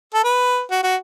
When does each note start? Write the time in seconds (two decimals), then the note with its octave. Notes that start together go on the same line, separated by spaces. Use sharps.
0.14 A4
0.24 B4
0.71 F#4
0.83 F#4